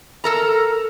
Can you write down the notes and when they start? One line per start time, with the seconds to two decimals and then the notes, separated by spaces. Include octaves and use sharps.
0.24 A4 A#4 A#5